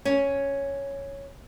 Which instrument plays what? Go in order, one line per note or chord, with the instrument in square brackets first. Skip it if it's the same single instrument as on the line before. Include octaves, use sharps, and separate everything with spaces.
[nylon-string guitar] C#4